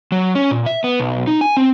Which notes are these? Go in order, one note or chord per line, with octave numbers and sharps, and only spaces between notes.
F#3
C#4
A#2
E5
B3
B1
D#4
G#5
C4